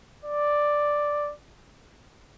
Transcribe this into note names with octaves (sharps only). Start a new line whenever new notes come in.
D5